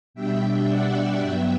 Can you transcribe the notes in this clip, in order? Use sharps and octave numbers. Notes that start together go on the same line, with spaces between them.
B2 G3 D4 E5 G5
D5 F#5
G2 F#3 B3 E5 G5